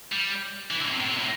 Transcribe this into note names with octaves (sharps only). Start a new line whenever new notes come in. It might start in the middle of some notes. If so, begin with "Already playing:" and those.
G3
E3
D3
A2
C3
A2
C3
A2